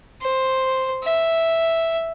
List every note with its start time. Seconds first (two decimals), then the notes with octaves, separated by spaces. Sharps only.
0.22 C5
1.03 E5